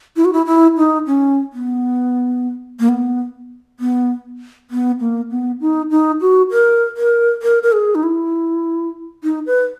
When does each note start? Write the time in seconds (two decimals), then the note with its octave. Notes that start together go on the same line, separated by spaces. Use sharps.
0.16 E4
0.25 F#4
0.33 E4
0.46 E4
0.77 D#4
1.07 C#4
1.53 B3
2.80 A#3
2.89 B3
3.80 B3
4.70 B3
5.00 A#3
5.31 B3
5.61 D#4
5.90 D#4
6.21 F#4
6.51 A#4
6.97 A#4
7.42 A#4
7.63 A#4
7.72 G#4
7.95 D#4
8.03 E4
9.24 D#4
9.46 B4